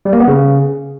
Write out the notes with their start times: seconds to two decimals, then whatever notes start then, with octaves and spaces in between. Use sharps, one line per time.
0.05 G3
0.13 A#3
0.20 B3
0.28 C#3